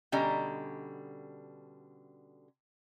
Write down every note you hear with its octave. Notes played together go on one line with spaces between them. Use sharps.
B2 D3 G3 C#4 D#5 A#5